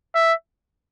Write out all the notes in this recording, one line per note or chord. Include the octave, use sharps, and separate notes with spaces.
E5